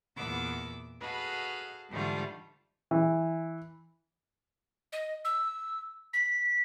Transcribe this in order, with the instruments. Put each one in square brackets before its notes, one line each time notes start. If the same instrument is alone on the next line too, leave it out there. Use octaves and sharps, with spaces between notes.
[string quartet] E2 A#2 B3 D6 E6
F#4 G#4 A4 B4 D#5 F5
G#2 D3 E3 G3 A3 F4
[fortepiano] E3
[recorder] D#5
E6
B6